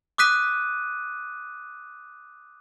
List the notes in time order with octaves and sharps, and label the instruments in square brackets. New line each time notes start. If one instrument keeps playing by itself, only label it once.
[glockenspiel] D6 D#6 F#6 B6 D#7